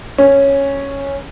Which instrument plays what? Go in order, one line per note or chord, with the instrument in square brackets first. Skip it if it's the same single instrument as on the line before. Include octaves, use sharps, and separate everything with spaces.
[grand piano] C#4